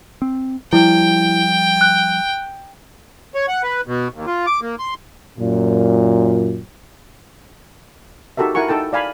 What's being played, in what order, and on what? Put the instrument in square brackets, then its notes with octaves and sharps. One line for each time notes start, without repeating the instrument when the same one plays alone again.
[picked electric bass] C4
[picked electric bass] F3 G3 [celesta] E4 [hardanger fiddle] G5
[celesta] F#6
[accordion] C#5
F#5
B4
B2
D#2
F4
D6
A#3
C6
[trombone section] F#2 A#2
[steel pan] D#4 F#4 G4 A4 A#4 E5
E4 A#4 F#5 G#5 C#6
D#4 A4 G5 A5
D5 F5 G#5 B5